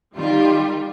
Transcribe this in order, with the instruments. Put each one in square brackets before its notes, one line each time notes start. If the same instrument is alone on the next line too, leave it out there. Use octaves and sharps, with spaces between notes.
[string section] D#3 G3 F4